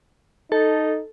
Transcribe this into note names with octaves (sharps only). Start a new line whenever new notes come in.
D#4 A4